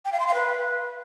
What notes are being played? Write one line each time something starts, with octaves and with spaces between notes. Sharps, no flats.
G5
F5
C6
F5
B4